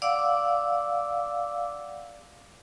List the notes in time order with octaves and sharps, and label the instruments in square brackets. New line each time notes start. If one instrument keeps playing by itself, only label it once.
[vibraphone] D5 F5 F#5 D6 E6